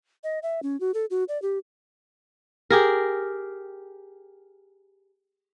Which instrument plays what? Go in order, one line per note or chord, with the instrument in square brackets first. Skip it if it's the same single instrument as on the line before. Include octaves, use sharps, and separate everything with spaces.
[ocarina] D#5
E5
C#4
F#4
A4
F#4
D5
G4
[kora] G4 G#4 A#4